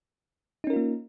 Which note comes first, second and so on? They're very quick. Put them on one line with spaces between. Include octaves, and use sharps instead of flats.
D#4 C#4 A#4 F4 A#3